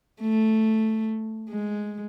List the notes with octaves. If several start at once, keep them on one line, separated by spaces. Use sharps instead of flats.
A3
G#3